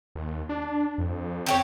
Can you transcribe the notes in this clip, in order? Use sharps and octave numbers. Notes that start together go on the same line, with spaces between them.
D#2
D4
F2
C4 G4 C#5